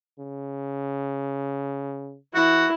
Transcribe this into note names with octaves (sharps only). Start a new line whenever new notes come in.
C#3
E3 E4 F#4